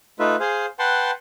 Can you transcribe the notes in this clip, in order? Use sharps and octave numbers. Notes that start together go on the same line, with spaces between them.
A3 D#4 F4 B4 E5
G#4 C5 F5
B4 F#5 G5 A5 C6